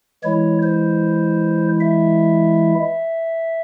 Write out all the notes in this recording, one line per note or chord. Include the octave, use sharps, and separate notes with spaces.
E3 G#3 E4 C#5
C5
E5